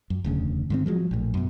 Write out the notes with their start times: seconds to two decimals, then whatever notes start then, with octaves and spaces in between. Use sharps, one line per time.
0.10 F#2
0.24 E1 D2 C#3
0.70 G#2 D#3 C4
0.86 F3 F#3 G#3
1.11 A#1 A2
1.34 F#2 B2